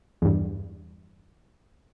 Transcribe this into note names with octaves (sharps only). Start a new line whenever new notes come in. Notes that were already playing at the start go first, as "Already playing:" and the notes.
E2 G2